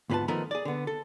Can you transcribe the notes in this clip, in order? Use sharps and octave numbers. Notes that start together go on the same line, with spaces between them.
D2 G#2 B3 F4 B4 A5
D#3 F3 A3 B3 D#4 A#4
G#4 D5
D3 B3
A4